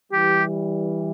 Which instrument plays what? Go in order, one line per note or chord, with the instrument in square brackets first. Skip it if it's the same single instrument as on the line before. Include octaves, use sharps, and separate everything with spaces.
[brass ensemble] E3 G3 [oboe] G4